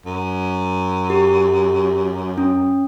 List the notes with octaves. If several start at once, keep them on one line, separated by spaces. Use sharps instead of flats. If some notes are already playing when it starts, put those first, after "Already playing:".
F#2
G4
C#4